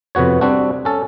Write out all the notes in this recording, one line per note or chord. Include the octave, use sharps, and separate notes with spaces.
F2 C3 B3 F#4 C#5
G3 C4 D4 F#4
C#4 A4